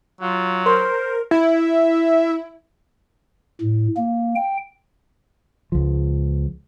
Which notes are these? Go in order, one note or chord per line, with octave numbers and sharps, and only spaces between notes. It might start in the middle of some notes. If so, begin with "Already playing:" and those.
F#3 F4
A#4 C5 C6
E4
A2
A#3
G5
C#2 F3